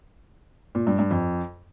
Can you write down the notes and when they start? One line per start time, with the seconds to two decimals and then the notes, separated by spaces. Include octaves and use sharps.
0.75 A#2
0.87 G2
0.99 G2
1.11 F2